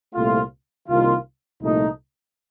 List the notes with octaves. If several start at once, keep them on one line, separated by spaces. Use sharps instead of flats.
C2 A#2 A3 C4 F4
C2 C3 D#3 A#3 F4
C2 A#2 F3 A3 D#4